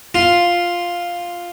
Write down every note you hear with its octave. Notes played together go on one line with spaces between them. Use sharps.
F4